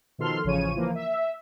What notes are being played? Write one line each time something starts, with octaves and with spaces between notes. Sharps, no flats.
B2 D#3 F3 A4 C6 F6
A1 C#3 F3 C#5 D#7
E3 F3 A#3
E5